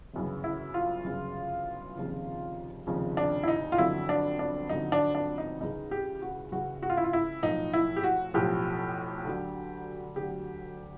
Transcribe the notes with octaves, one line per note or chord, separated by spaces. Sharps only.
G1 F#2 C#3 E3
E4
F4
G1 F#2 C#3 E3
F1 D#2 C#3 F3
F1 D#2 C#3 F3
D4
E4
D#4
F4
G1 F2 D3 F#3 E4
D4
D4
G1 F2 D3 F#3 D#4
D4
D4
D#4
C#2 C#3 E3 D#4
G4
F#4
C#2 C#3 E3 F#4
F#4
F4
E4
F4
E4
B1 A2 F3 D#4
E4
G4
F#4
B1 A2 F3 G4
D2 D3 F#3
D2 D3 F#3 G4